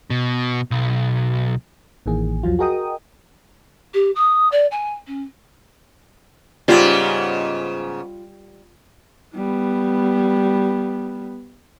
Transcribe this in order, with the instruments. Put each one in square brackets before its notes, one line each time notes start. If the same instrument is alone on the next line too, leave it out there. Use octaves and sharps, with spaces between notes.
[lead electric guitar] B2
B1
[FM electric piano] A1 D#3 E3 A#3 G#4
B1 E2 F3 F#3 F4
F#4 G#4 A#4 D#5 G5 D#6
[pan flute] G4
D#6
D5
G#5
C#4
[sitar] G#2 C#3 B3 [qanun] G3 F4 C#5
[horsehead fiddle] G3 B3